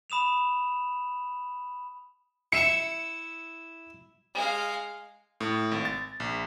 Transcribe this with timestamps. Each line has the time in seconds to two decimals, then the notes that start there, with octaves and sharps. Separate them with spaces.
0.10 B5 D#6 E7 F7
2.52 E4 E5 C#7 E7
4.34 G#3 F5
5.40 A2
5.72 G#1
5.85 A6
6.20 A#1